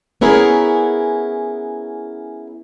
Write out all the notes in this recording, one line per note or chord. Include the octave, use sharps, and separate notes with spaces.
B3 C#4 E4 G#4 A#4